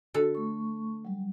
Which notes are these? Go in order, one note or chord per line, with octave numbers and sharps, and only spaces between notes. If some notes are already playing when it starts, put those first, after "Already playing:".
D3 F#4 A4
A3 C#6
F#3 G3